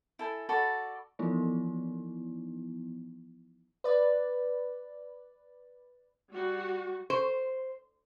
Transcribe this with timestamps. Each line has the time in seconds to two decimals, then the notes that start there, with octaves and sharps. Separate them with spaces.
0.19 E4 A4 G#5
0.49 F#4 A4 D5 B5
1.19 E3 F3 B3 D#4 E4
3.84 B4 D5
6.30 G3 F#4
7.10 C5